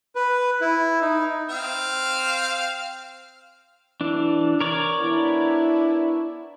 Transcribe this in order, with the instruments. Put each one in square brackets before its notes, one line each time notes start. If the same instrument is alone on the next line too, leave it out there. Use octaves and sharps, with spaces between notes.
[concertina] B4
E4
D#4
[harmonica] C4 F5
[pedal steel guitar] E3 D4
A#4 C#5 D5
[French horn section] B3 D4 E4